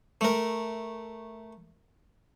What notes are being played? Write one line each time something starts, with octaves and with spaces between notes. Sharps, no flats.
A3 A#4